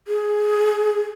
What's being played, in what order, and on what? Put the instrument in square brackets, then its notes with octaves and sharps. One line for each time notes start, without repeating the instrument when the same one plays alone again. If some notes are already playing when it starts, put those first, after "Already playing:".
[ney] G#4